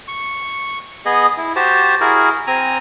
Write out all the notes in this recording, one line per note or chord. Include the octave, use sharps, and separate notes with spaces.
C#6
B3 G#4 D#5
E4
F#4 G4 C5 A5
E4 F#4 G#4 A#4
C4 G#5 A#5